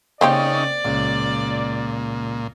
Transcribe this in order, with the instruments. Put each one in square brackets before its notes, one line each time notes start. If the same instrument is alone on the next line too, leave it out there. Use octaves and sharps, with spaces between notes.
[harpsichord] C#3 [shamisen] A#3 C4 G4 [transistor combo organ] C#4 D#4 [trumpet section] D5
[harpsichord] C#2 [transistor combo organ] A#2